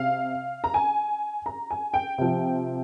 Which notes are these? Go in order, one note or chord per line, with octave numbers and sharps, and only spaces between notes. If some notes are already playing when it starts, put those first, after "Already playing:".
Already playing: C3 F5
A#5
G#5
A#5
G#5
G5
C3 F3